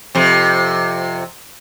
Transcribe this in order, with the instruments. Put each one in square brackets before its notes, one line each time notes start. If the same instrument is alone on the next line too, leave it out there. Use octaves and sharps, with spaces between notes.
[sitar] F2 C3